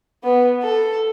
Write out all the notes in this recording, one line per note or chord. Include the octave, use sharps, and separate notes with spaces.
B3
A4